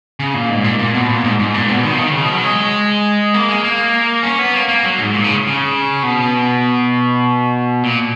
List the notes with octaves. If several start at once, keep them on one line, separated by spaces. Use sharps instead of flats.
C#3
A#2
G#2
A#2
A#2
B2
A#2
G#2
G#2
A#2
B2
D#3
F3
D#3
C#3
B2
F#3
G#3
A#3
G#3
A#3
C#4
B3
A#3
A#3
F#3
G#2
A#2
C#3
C#3
B2
A#2